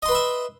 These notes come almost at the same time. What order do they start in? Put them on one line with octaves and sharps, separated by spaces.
D#5 C6 B4 B5 E5